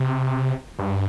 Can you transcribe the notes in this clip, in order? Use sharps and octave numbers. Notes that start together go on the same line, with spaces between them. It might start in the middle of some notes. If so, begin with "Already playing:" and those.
Already playing: C3
G2